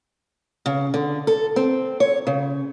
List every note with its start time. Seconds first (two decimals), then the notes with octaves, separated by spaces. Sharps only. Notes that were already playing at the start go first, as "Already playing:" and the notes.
0.66 C#3
0.94 D3
1.27 A4
1.56 C4
2.00 C#5
2.27 C#3